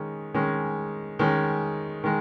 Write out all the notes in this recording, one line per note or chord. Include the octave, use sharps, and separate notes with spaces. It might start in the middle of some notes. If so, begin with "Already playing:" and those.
Already playing: D#3 G#3 C#4
D#3 G#3 C#4
D#3 G#3 C#4
D#3 G#3